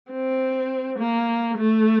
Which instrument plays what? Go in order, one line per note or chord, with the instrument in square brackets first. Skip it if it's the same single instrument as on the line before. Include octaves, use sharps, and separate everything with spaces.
[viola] C4
A#3
A3